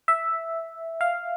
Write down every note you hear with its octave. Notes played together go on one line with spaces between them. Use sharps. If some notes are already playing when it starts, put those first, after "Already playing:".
E5
F5